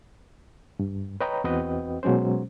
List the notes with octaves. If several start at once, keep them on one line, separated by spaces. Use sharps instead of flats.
G2
B4 C#5 D#5 G5 A#5 B5
E2 C4 F#4 B4 D#5 G5
B2 F#3 G#3 C#4 C5